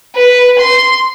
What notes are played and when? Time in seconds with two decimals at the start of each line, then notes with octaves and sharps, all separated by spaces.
0.15 B4
0.59 C6